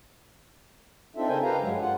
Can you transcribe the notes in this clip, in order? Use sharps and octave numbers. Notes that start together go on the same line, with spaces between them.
C4 D4 D#4 F4 A4 E5
C#3 A4 A#4 C5 G5 G#5
G4 A4 B4 F5 A#5
G2 F#3 G#3
F4 F#5